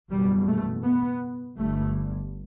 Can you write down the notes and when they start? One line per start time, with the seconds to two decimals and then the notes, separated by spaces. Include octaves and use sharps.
0.10 F#1 E2 B2 G3
0.47 A3
0.84 B3
1.59 G1 G2 A3